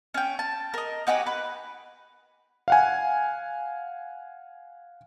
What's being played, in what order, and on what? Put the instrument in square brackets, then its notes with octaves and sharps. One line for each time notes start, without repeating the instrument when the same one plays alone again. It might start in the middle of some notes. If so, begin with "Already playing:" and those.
[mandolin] C#4 G5
A5
A#4 D#5
D#4 F#4 G4 G#5
B4
[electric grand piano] F5 F#5 G#5